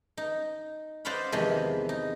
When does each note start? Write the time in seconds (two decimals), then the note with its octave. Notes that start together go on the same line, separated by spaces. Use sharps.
0.17 D#4
1.05 C5 D5 D#5 F5 F#5 B5
1.32 E2 C3 D#3 F3 G#3
1.89 D#4